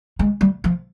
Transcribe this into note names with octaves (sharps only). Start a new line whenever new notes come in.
G#3
G3
F3